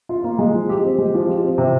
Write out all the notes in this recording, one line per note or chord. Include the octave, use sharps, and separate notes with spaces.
F4
A#3
G#3
F3
G4
C4
G#3
F3
G4
C4
C3